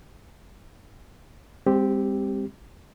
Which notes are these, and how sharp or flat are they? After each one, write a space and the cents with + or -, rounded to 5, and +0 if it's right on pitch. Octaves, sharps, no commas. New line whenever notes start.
G#3 -45 C4 +0 G4 +0